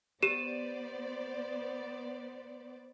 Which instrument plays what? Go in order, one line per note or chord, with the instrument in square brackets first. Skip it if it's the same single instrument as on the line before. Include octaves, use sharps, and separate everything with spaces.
[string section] B3 C5 D5 [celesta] G4 D#7 E7